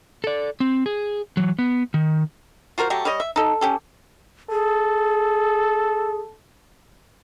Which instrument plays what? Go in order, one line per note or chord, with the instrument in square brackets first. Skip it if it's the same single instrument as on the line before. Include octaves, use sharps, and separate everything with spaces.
[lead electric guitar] A4 D5
C4
G#4
E3 F#3
B3
D#3
[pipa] F4 F#4 A#4 C5
F#3 A3 F#4 G4
G3 G4 C#5 D#5
E5
D#4 A4
C#4 G4 A4
[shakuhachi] G#4 [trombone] A4